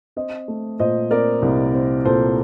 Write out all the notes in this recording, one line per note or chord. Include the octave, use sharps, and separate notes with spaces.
C4 C5 D#5
A3
A#2 C5 D#5
C4 A#4 D5
C2
C4
A#2 A4 C5